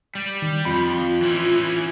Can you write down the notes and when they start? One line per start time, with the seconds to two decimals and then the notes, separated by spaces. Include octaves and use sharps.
0.15 G3
0.42 D#3
0.65 F2 F4 B5
1.23 E3 C#4